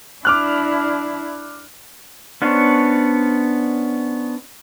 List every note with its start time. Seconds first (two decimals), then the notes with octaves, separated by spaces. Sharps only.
0.25 D4 E4 D6 F6 F#6
2.42 B3 C#4 D4 C5 C#5